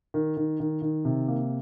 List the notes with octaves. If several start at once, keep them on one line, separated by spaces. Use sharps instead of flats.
D#3
D#3
D#3
D#3
C3
A#3